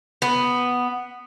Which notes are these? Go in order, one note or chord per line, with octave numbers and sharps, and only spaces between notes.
B3